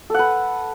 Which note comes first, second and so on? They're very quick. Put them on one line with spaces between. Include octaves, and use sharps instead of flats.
A4 F#5 B4